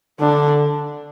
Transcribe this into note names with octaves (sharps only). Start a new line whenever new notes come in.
D3 D4